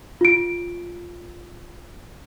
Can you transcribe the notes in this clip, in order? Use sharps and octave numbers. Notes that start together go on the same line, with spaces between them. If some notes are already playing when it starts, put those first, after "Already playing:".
F4 D7